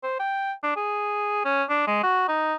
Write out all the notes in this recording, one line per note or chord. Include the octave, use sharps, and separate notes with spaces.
C5
G5
D4
G#4
C#4
D4
G#3
F#4
D#4